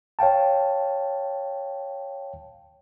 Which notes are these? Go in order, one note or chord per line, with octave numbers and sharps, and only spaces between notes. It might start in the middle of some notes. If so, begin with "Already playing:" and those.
C#5 F5 G5 A5